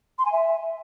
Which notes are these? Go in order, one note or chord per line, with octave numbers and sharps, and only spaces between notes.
C6
G#5
E5